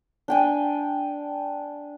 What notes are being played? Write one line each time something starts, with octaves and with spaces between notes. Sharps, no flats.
D4 G5 G#5